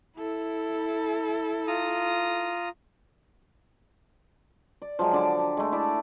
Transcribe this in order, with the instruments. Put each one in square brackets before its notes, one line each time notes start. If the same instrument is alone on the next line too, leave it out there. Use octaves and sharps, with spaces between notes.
[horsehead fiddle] E4 A4
[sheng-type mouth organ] F4 A#5 D#6
[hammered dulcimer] D5
F3 F#3 G#3
D3 D5
G4
G#3 A3
E4 D5 A5